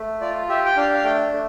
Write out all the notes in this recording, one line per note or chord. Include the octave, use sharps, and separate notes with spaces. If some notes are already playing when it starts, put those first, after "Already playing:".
Already playing: A3
F4 D5
G4 E5
G5
D4 F5
F5
A3 G5
A3